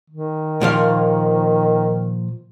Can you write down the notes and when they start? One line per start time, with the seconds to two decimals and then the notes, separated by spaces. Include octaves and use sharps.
0.10 D#3
0.61 A#2 F3 F5